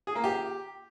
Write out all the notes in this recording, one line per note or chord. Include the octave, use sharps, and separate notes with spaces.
G#4
A#3
G4